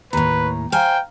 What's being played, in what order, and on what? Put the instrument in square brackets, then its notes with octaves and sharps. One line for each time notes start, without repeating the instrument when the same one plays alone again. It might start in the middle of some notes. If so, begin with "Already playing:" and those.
[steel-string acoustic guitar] D#2 A2 [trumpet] B4 [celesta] A#5
[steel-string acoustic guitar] C5 G#5 [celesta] F5 A#5 F6 [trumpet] G5